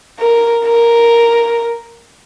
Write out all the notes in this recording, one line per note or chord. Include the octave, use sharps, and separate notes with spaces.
A#4
A#4